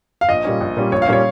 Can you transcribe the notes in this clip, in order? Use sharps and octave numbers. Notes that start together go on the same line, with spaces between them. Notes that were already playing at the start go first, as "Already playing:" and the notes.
F5
A#1 D#5
A#2 G3 C#4
A#1
A#2 G3 C#4
A#1 C#5
F5
A#2 G3 C#4 C#5